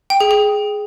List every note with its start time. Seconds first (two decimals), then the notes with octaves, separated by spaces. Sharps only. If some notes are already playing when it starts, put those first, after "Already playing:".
0.10 G5
0.20 G#4
0.31 G#4